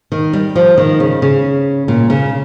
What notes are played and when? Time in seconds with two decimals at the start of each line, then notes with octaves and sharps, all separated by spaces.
0.12 D#3
0.33 G3
0.56 F3
0.78 D#3
1.00 C#3
1.22 C#3
1.88 A#2
2.10 C#3